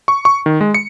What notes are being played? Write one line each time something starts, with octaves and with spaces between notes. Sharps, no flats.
C#6
C#6
D#3
G#3
C#7